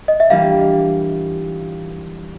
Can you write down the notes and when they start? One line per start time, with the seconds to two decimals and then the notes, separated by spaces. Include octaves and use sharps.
0.08 D#5
0.20 E5
0.30 E3 G3 A#3 D4 F4 F5